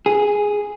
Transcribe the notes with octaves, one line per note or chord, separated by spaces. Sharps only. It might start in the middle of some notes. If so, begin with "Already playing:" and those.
G#4